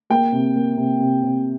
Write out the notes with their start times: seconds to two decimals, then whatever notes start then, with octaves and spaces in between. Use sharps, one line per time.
0.10 A#3 G5
0.32 C3
0.56 A#3
0.77 C3
1.00 C3
1.23 C3